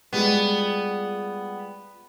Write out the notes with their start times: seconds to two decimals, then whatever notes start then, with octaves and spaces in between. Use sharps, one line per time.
0.13 G3 G#3 B3 F4